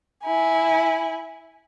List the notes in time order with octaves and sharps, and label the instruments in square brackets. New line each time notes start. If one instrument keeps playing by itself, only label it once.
[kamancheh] E4 G#5